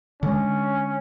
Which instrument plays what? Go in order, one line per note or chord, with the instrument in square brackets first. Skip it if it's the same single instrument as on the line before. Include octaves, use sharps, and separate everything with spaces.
[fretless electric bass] D3 G#3 [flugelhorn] C#4